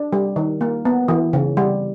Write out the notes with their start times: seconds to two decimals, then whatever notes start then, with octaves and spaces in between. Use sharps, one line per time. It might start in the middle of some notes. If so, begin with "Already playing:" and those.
Already playing: D4
0.13 G3
0.36 D#3
0.61 A#3
0.85 B3
1.08 E3
1.33 C#3
1.57 G3